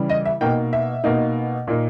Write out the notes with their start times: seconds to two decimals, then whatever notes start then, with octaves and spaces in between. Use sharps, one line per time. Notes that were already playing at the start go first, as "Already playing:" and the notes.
Already playing: C#3 E3 G3
0.10 D#5
0.25 E5
0.41 B2 A#3 D#4 G5
0.73 E5
1.04 B2 A#3 D#4
1.67 A#2 A#3 D#4